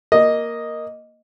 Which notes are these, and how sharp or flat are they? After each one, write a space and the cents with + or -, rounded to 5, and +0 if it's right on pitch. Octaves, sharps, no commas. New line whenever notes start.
A#3 +0 D#5 +0